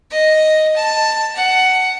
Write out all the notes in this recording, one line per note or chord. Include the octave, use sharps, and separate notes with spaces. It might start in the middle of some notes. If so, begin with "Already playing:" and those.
D#5
A5
F#5